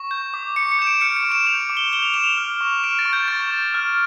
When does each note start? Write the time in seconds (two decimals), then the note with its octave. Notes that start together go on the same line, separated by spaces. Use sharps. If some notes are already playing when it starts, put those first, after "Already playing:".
Already playing: C#6
0.11 G6
0.34 D6
0.56 C#6 C#7
0.72 C#7
0.79 G6 E7
0.87 D7
1.01 F6 C#7
1.17 D7
1.24 C#6
1.32 E7
1.47 G6 F7
1.69 D6
1.77 G7
1.92 G6 G7
2.03 F7
2.14 D6 E7
2.24 F7
2.37 F6
2.61 C#6
2.84 F6 D7
2.99 A6
3.05 C#6
3.13 G6
3.28 C#6 A6
3.51 G6
3.74 F6